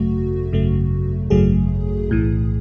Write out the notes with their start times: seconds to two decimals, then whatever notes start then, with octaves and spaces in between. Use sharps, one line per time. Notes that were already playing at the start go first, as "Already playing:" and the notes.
Already playing: G#1 F#2 C#3 F#3 A3 F#4
0.52 G#1 F#2 C#3 F#3 A3
1.30 G#1 F#2 C#3 F#3 A3 G#4
2.09 B1 A2 E3